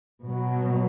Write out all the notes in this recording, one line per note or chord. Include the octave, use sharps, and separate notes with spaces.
B2 F#3